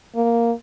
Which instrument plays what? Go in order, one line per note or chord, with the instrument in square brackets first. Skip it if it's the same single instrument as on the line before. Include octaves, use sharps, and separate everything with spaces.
[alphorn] A#3